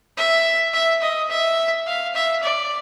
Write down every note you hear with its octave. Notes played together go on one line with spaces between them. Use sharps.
E5
E5
D#5
E5
F5
E5
D5